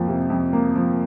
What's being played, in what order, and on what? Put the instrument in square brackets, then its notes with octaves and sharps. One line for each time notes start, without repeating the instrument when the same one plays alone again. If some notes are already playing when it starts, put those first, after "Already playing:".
Already playing: [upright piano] F2 F3 A#3
C3
F2
A#3
F3